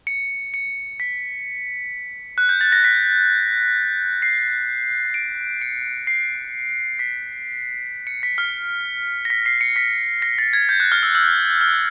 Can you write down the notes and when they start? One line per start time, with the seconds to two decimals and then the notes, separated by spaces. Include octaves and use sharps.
0.07 C#7
0.54 C#7
1.00 B6
2.38 F#6
2.49 G6
2.61 A6
2.72 A#6
2.84 B6
4.22 C7
5.14 D7
5.61 C#7
6.07 C7
6.99 B6
8.07 C#7
8.23 B6
8.38 F6
9.25 A#6
9.30 B6
9.46 C7
9.61 C#7
9.76 B6
10.22 A#6
10.38 A6
10.53 G#6
10.69 G6
10.80 F#6
10.92 F6
11.03 E6
11.15 E6
11.61 F6